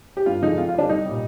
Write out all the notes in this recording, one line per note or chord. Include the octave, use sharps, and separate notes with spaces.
G4
G2 F4
D3 F3 G#3 D#4
F2 F4
F4
D3 G3 D4
C2 D#4
A#2 G3